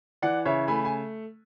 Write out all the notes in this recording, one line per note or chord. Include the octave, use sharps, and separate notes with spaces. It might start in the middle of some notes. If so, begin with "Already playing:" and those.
E3 D5 F#5
C#3 C#5 E5
A3 G#5 B5
G#5